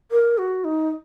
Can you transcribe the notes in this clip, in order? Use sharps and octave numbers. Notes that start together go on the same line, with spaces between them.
A#4
F#4
D#4